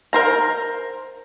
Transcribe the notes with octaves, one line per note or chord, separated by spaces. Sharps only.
A#4 C5 A#5